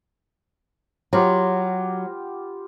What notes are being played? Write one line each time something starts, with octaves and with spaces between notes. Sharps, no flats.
F#3 B3 F4 G4